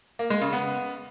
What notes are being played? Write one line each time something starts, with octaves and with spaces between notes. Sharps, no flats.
A#3
G#3
C#3
B3